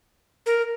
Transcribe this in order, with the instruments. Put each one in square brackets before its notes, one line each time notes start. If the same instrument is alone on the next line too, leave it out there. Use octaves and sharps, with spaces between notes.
[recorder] A#4